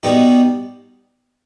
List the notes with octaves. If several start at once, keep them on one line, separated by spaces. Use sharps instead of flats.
B2 G3 B3 D#4 G4